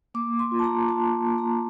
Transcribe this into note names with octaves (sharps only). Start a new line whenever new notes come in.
A#3 D6
A#3
C6
F4
A5
A#5
A#3
F4 A5
A#3
A#3
A#5
F4